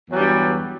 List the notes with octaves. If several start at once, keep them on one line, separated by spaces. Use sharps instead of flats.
E2 G2 F#3 G3